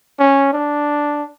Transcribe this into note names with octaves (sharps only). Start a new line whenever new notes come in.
C#4
D4